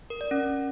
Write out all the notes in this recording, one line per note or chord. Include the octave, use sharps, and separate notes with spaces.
A#4
D5
C#4